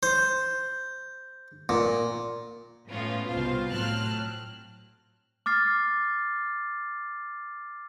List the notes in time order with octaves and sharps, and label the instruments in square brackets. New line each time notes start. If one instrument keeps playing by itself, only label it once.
[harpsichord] C5
A#2
[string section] A2 B3 C#4 F4
C2 B2 F4 C5 F5
A2 F#3 C4 A5 F6 F#6
[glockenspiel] D6 F6 A6 C7